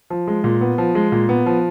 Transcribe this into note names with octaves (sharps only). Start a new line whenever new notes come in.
F3
G#3
A#2
B3
F3
G#3
A#2
B3
F3